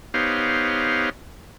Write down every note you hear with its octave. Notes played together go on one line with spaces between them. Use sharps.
B3 D#4 G4 C5 C#5 F5